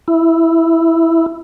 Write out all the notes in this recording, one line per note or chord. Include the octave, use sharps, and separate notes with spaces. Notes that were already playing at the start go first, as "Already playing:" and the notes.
E4